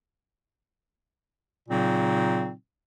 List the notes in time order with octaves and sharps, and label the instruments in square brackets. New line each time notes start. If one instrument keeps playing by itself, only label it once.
[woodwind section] A#2 C#3 F#3 C4 D#4